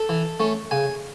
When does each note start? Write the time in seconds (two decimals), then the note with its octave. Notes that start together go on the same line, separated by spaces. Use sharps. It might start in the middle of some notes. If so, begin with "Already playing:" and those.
Already playing: A4
0.09 E3
0.40 A3 C#4
0.71 C#3 G#5